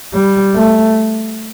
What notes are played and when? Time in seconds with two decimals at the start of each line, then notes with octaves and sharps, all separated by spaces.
0.14 G3
0.55 A3